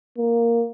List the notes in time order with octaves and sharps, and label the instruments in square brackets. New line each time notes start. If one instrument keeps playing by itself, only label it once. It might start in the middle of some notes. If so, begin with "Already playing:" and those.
[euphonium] A#3